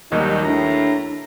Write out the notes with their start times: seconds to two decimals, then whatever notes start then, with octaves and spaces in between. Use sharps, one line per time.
0.12 D#2 D#3 F#3 G3 D#4
0.45 A2 D4 A#5